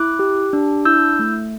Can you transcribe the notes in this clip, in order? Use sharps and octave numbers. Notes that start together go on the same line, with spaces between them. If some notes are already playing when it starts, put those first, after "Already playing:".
Already playing: E4 D6 F#6
G4
D4
E4 E6 G6
A3